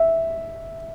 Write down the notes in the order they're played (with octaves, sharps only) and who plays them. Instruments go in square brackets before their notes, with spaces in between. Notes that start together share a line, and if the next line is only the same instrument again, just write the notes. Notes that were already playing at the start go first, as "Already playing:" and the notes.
Already playing: [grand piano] E5